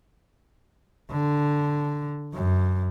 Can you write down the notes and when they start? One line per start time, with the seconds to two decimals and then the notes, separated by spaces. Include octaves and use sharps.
1.11 D3
2.34 F#2